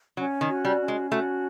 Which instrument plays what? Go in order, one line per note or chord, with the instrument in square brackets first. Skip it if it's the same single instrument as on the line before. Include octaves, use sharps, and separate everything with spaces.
[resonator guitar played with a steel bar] F#3 [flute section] C#4
[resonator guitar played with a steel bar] D#3
[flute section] F#4
[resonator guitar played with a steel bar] G3
[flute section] C#4
[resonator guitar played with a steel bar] G#3
[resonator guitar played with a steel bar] A3 [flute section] F#4